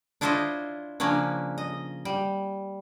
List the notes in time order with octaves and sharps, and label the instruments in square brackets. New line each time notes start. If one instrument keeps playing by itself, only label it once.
[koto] D4 E4 F4 C5 C#5 D#5
C#3 F3 A#3 C#4 D4
D#5
G3